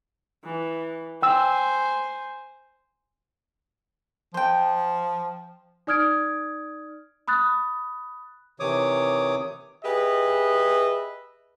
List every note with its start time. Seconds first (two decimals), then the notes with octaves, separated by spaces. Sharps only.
0.44 E3
1.22 C5 G5 G#5 E6
4.34 F3 C5 G5
5.87 D#4 D5 D#6 F6 G#6 D7
7.28 B5 D#6 F#6 A6
8.60 C3 D#3 E3 C#5 D6 D#6
9.84 G4 G#4 B4 D#5 E5